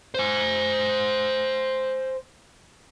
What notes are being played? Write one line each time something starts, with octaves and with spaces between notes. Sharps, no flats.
C5 G#5